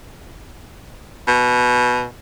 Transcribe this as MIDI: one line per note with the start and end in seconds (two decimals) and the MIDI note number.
1.28 2.06 47